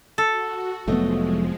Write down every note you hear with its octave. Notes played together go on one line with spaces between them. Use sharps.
F#4 A4
F1 A2 F3 F#3 G#3 A3 B3 D#5